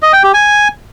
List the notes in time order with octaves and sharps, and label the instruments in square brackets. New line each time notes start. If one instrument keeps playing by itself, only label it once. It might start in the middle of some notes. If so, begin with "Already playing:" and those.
[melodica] D#5
G5
G4
G#5